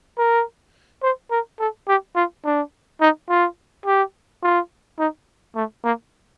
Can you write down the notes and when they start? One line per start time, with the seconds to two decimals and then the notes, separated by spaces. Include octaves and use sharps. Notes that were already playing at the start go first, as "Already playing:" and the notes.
0.18 A#4
1.03 C5
1.31 A#4
1.59 A4
1.88 G4
2.16 F4
2.44 D4
3.01 D#4
3.29 F4
3.86 G4
4.43 F4
4.99 D#4
5.55 A3
5.84 A#3